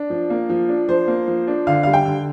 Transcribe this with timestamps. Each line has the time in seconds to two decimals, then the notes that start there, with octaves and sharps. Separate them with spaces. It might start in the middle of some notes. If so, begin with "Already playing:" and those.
Already playing: D4
0.10 F3
0.30 A#3
0.49 F3
0.69 D4
0.88 F3 C5
1.07 A#3
1.28 F3
1.48 D4
1.67 D3 F5
1.83 G3 F5
1.93 G5
2.05 D3